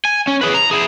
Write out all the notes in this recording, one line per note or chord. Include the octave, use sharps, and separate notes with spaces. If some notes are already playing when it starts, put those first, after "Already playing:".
G#5
C#4
G#4 B4
A#5
E4 G#4